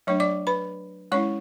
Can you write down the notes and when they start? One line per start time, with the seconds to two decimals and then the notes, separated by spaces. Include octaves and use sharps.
0.07 F#3 A3 D4 C#5 C#6
0.20 D5 D6
0.47 B4 B5
1.12 G#3 C#4 E4 C#5 C#6